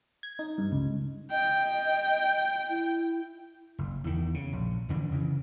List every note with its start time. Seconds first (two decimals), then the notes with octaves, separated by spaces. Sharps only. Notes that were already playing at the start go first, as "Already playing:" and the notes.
0.23 G#6
0.39 D#4
0.58 G2
0.72 C#2
1.31 D#5 G5
2.69 E4
3.79 F#1
4.04 E2 D#3
4.34 C#3
4.53 A#1
4.89 F2 D3 E3 D4
5.11 C#3 E3